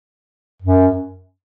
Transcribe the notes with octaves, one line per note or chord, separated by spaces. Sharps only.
F#2